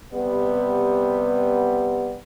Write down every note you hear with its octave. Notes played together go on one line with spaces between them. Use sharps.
C3 G3 B3